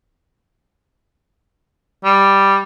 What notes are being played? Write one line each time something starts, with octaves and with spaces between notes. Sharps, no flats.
G3